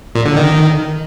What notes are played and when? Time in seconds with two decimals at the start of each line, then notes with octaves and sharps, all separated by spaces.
0.15 A#2
0.26 D3
0.36 D#3